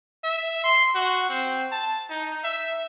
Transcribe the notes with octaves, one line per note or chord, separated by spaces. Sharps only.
E5
C6
F#4
C4
A5
D#4
E5